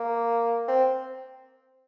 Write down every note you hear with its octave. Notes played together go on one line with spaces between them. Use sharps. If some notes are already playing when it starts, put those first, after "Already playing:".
Already playing: A#3
C4